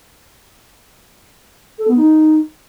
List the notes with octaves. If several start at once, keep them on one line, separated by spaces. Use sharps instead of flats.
A4
B3
D#4